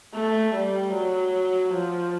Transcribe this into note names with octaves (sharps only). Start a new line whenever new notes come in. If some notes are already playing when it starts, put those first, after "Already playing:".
A3
G3
F#3
F3